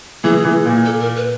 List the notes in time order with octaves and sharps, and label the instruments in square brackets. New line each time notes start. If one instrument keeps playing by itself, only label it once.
[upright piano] E3 [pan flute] G#4
[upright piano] E3
A#2
[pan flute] A4
A#4
B4